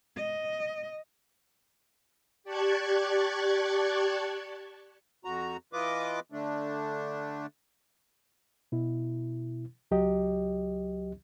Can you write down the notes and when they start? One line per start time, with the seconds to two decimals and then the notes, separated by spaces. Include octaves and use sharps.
0.17 D#5
2.44 G4 D5 A5 C#6 F#6 G#6
5.25 F2 F#4 A#5
5.73 E3 F4 B4 D#5 D6
6.32 D3 A3 D4
8.72 B2 E4
9.91 C#2 F#3 G4 D#5